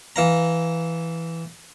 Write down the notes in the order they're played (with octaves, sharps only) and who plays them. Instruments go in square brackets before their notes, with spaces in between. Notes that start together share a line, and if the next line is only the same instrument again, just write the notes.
[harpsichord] E3 F5 A#5